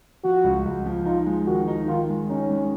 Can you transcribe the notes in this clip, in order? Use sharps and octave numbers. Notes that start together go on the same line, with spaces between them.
F3 F#4
C#2
C#2
F3
D#4 F4
G#3
D#3 F#4
D#4
D#3 F4
G#3
C#4 D#4
G#3